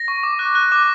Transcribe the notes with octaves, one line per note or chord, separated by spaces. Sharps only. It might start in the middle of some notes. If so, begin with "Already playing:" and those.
Already playing: A#6
C#6
D6
F#6
F#6
D6